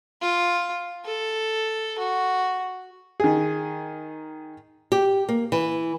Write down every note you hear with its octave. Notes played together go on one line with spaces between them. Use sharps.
F4
A4
F#4
D#3 G#4
G4
A#3
E3